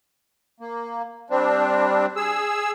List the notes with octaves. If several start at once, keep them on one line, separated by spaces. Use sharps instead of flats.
A#3
G3 C4 D4
G#4 E6